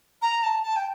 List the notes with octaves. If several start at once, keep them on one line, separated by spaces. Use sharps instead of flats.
A#5
A5
A5
G5